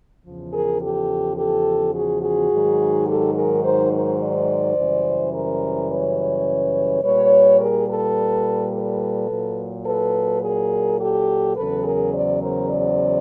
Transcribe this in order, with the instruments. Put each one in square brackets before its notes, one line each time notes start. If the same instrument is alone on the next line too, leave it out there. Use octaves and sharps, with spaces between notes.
[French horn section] E2 C#3 F3
G#4 A#4
G4 A4
G4 A4
F#4 G#4
F#4 G#4
G#2 D#3 F#3
G4 A4
G#4 A#4
A#4 C5
A#4 C5
C5 D5
F#2 C#3 E3 G3
A#4 C5
B4 C#5
A#2 G3 B4 C#5
G#4 A#4
A4 B4
A4 B4
A#2 F#3
A4 B4
G#4 A#4
G4 A4
E2 C#3 F#3 A4 B4
G#4 A#4
C5 D5
A#4 C5
C5 D5